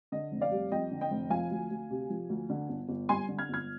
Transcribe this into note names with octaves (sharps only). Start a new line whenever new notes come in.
D3 D#5
F1
D5 F5
G3
F2 D#5 G5
D3
D#5 G5
F1
F3 F5 G#5
D2
D2
C3
F3
D2
D3
G1
G1
G2 G#5 C6
D3
F6 G#6
G1 F6 G#6